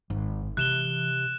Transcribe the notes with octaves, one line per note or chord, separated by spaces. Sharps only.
G#1 G#2
C3 E3 F#6 E7 G7